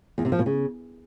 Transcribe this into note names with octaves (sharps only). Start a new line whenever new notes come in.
E2
C3
F3
B2
C#3